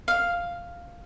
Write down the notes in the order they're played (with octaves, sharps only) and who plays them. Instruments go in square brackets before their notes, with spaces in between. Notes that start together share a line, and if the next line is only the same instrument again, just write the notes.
[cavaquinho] F5